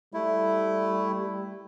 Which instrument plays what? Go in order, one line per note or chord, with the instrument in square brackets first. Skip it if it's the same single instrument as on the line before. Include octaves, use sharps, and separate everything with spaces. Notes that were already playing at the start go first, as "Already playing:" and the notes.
[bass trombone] G3 [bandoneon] A3 E4